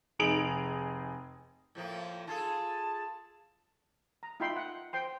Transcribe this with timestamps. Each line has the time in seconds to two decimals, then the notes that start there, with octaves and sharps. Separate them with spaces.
0.19 F1 D#4 G#4 D7 F7 F#7
1.75 A2 F3 A#3
2.27 F4 G#4 A4 A5
4.23 A#5
4.40 D#4 F4 E5 G5 B5 C6
4.56 F#5
4.93 C5 G5 C6